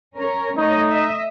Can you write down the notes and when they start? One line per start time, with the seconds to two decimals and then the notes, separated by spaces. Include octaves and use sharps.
0.16 C#4 A#4 C#5
0.57 A3 D#4 C#5 D#5
0.89 D#5 E5